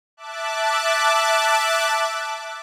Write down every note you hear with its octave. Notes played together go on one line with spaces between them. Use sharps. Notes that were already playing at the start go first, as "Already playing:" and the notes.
E5 A5 D6 F#6